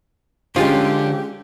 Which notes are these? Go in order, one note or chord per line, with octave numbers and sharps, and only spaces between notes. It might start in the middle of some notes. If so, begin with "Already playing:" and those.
D3 F3 G#3 C#4 F4 G4